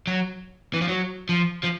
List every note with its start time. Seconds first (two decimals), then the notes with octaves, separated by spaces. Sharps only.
0.07 F#3
0.73 E3
0.81 F3
0.88 F#3
1.29 F3
1.64 F3